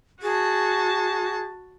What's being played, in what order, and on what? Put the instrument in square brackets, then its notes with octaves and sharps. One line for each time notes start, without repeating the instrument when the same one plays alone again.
[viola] F#4 A5 [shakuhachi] G#4